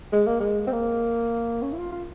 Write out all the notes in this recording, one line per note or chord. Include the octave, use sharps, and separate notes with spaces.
G#3
A#3
G#3
C4
A#3
C#4
E4
F4
F4